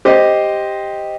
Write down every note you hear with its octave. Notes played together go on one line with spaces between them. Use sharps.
G4 C5 D#5